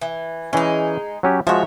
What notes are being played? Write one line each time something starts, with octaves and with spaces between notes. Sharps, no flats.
E3
E3 G#3 C#4 D#4
F#3 C#4 G4
F3 G#3 F#4 C#5 E5